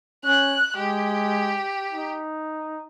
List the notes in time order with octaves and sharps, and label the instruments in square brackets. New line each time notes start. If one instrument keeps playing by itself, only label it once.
[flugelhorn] C#4 [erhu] F#6
[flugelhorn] G#3 [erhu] G4
[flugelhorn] D#4